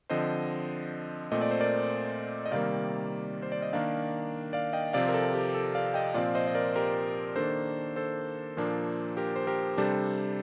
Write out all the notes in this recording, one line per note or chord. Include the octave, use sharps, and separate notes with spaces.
D3 F3 C4 C5 D#5
A#2 A3 C4 D#5
D5
C5
A#4 D5
D#5
C3 D#3 G3 A#3 D5 F5
C5
D5
D#5
D#3 A#3 D4 D5 F5
D5 F5
D#5 G5
C3 F3 C4 D5 F5
A#4
A4
G4
A4
D5 F5
D#5 G5
A#2 F3 C4 D5 F5
C5 D#5
D#5
A#4 D5
G4 A#4
D#3 A#3 D4 A4 C5
A4 C5
A#2 F3 A#3 D4
G4 A#4
C5
G4 A#4
C3 G3 D4 A4 C5